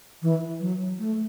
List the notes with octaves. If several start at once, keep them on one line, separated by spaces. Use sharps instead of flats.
E3
F#3
A3